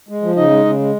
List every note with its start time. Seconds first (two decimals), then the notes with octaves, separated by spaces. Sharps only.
0.09 G#3
0.22 F3
0.37 C#3 D#4 D#5
0.51 G#3
0.65 C#3
0.79 G#3